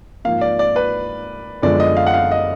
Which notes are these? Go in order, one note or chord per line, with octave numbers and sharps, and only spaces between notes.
G#2 F3 A#3 F5
D5
D5
B4
F#2 D3 F3 G#3 B3 D5
D#5
F5
F#5
F5
D#5